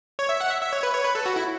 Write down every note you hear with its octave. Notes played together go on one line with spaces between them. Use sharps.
C#5
E5
F#5
E5
E5
C#5
B4
C#5
B4
A4
F#4
E4